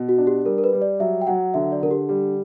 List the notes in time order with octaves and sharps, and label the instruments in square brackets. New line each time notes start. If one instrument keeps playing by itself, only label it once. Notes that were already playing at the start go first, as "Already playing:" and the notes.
Already playing: [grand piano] B2
[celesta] F#4
[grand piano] D4
[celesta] G4
[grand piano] G3 [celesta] A#4
[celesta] A#4
B4
[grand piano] G3
[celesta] D5
[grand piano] F#3 [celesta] E5
[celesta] G5
[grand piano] F#3 [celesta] F#5
[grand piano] D3 [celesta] E5
[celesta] D5
[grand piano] D3 [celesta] A#4
[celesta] G4
[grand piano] G3 [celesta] G4